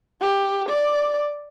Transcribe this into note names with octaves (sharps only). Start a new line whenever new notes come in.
G4
D5